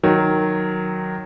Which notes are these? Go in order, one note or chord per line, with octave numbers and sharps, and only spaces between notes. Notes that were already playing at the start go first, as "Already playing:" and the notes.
D#3 F#3